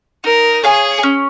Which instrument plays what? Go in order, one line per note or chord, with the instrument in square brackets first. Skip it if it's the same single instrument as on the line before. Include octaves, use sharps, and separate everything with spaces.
[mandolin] D#4 [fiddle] A#4
[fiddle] G#4 [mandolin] C#5 F5 G#5
[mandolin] C#4